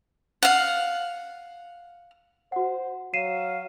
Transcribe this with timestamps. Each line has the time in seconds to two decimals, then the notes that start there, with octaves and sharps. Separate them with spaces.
0.43 F5 F#5
2.52 F#4 C5 F#5
3.14 F#3 F5 C7 D#7 E7